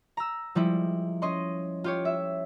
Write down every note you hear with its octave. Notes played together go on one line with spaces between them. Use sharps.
A#5 E6
F3 G3 G#3 E4
C#4 D#5 C6
F4 G4 C#5
E5